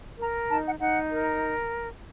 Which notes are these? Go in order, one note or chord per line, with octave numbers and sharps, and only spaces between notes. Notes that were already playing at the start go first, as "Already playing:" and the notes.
A#4 A#5
D#4 A5
F#5
D#4 F#5
A#4